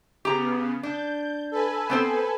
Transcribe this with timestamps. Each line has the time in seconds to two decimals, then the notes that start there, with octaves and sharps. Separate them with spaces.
0.25 C#3 B3 G4 A#5
0.83 D4 G6
1.51 A4 B4 G#5
1.90 B3 C4 C5